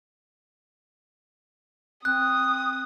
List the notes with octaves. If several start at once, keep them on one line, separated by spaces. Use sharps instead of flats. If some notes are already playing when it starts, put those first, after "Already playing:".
C4 D#6 F#6